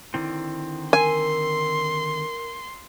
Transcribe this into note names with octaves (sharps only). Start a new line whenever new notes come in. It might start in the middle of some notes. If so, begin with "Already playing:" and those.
D3 D#3 C4 E4
A#4 G#5 C6